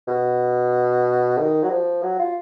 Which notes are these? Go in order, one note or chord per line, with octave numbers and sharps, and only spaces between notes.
B2
D#3
F#3
F3
F#3
F4